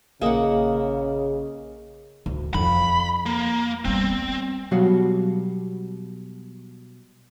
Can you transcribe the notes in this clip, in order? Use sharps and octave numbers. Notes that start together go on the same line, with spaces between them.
A#1 C#3 A#3 G#4 D#5 F#5
D2
F2 F3 B5
A#3
G3 B3 C4
B2 F#3 G3 F#4 C#5 F5